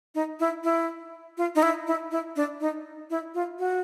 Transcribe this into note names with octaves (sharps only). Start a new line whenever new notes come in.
D#4
E4
E4
F4
D#4
E4
E4
E4
D4
D#4
E4
F4
F#4